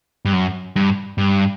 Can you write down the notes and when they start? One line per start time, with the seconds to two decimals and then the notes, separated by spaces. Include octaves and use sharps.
0.25 G2
0.33 F#2
0.76 G2
1.18 G2